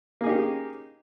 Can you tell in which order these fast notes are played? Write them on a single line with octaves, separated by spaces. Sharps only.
A#3 G#4 D#4 G4 C#4